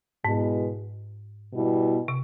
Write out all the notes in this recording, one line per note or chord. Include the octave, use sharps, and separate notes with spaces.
G#2 B2 G#3 B3 E4
B2 G3 B3 E4
C3